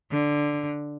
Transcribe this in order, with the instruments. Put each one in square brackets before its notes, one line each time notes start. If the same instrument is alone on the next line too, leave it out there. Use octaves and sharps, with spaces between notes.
[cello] D3